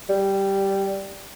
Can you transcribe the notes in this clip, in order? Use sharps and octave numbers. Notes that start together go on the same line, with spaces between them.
G3